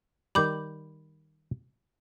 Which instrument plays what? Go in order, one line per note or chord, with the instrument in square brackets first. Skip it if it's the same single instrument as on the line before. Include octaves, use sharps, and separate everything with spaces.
[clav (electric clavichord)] D#3 G3 [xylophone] B5 D6 G6